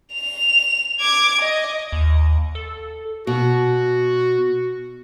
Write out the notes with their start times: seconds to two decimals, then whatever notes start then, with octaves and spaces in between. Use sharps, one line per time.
0.13 F7
1.00 D6 G#6
1.41 D#5
1.92 D#2
2.55 A4
3.27 B2 F#4